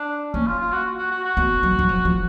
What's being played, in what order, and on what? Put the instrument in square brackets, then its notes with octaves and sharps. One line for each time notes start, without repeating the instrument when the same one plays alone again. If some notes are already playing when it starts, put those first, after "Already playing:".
Already playing: [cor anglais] D4
[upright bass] A#3 [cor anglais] C#4
[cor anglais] F4
F4
F#4
F#4
F#4
F#4
[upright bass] B3
F#3
F#3
F3
F3